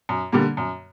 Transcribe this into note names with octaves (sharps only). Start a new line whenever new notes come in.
F#2
D3 G3 A#3
F#2